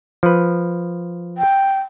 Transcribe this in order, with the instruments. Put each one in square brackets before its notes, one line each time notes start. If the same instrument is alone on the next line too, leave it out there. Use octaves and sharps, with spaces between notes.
[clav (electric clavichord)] F3 B4
[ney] G5